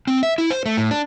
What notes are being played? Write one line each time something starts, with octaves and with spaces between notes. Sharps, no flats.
C4
E5
E4
C5
A3
A2
D4